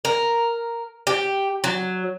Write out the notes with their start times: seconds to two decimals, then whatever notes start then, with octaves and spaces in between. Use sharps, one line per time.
0.05 A#4
1.07 G4
1.64 F#3